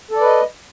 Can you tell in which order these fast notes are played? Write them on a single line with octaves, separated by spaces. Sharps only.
A4 D5 B4 D#5